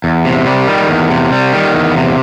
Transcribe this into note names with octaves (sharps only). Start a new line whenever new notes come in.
E2
C3
G3
D#3
E2
C3
G3
D#3
E2
C3